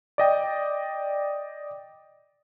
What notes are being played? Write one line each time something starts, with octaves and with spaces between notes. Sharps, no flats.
D5 D#5 G5